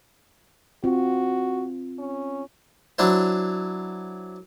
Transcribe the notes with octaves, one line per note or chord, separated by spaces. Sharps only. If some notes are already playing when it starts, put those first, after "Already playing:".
C4 F4 F#4
C#4
F#3 D4 E4 C5